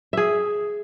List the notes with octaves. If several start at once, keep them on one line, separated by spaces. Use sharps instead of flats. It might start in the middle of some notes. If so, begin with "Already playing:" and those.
G#4 E5